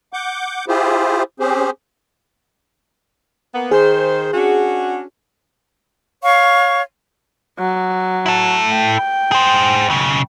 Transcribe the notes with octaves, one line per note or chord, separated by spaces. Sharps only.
F#5 D6 G6
E4 F4 G4 G#4 C5
C4 C#4 G4 G#4 C5
A#3 B3
D#3 G#4 C5
C#4 D4 F#4
C#5 F5 C#6
F#3
E4 A4
G5
G#4 C5
B1 C#3